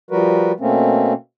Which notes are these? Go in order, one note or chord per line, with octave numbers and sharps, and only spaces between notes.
F3 G3 F#4 A#4 B4
B2 A3 A#3 C4 C#4